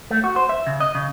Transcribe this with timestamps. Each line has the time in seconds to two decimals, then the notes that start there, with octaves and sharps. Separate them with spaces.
0.11 A3
0.24 F#4
0.36 C5
0.49 E5
0.67 C#3
0.80 D#5
0.95 C#3